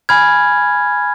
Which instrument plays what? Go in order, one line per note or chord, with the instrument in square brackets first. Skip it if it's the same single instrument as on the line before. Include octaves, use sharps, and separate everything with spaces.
[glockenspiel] G#5 B5 F6 G#6